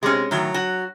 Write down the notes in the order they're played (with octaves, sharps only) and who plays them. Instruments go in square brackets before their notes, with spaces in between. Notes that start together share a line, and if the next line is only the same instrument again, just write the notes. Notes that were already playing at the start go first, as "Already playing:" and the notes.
[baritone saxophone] C3 [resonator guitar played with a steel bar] G#3 C#4
[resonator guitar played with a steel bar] A2 D#3 [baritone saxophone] F#3
[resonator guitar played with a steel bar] F#4